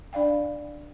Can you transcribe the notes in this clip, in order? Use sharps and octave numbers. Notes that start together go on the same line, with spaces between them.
D4 D5 F5 G5